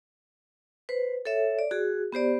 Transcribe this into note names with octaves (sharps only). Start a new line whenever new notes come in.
B4 C5
A4 C#5 E5
D5
F#4 G#4
B3 G4 C5 D5